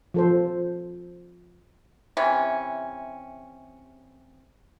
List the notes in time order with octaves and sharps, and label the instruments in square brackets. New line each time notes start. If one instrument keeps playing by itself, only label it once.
[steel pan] F3 A4 C5
[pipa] C3 E3 C#4